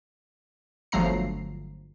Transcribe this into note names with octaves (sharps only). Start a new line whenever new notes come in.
G1 F3 F#3 A3 A#5 C7